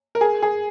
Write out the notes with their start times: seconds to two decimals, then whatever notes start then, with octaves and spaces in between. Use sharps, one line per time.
0.15 A#4
0.21 G#4
0.42 G#4